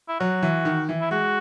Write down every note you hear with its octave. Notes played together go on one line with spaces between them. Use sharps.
E4
F#3 F#4
E3
D#3
E3
E4
G#3 F#4